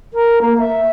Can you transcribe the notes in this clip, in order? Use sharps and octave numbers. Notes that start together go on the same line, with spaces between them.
A#4
A#3
E5